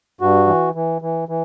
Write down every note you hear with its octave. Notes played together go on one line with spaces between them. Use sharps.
G2 F#4
E3
E3
E3
E3